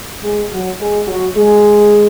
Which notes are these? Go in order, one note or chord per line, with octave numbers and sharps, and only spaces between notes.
G#3 G#4
F#3 F#4
G#3 G#4
F#3 F#4
G#3 G#4